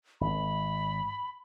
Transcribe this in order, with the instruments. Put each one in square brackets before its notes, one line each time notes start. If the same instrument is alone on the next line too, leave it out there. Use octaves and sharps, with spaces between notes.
[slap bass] G#1 [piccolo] B5